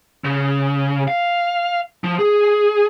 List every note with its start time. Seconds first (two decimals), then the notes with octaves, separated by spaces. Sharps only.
0.24 C#3
1.08 F5
2.04 F3
2.19 G#4